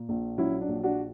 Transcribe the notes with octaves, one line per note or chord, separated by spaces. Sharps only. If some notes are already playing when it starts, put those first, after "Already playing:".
Already playing: A#2
A#1
F#3 C#4 E4
D4
A#1
D4 F#4